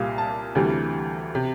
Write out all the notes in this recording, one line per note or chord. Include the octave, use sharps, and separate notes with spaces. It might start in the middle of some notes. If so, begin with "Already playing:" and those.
Already playing: C2 A#2 G3 F5
A5
D2 C3 E3 G3
C3